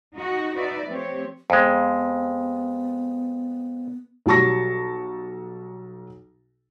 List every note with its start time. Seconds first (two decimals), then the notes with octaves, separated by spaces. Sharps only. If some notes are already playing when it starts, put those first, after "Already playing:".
0.15 D#4 F#4
0.56 D#4 F#4 B4 D5 E5
0.89 F3 A3 C4 G4 C#5
1.50 F2 G#3 B3
4.26 B1 F#3 G3 A5 C#6 A#6